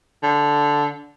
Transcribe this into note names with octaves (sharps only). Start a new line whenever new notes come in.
D3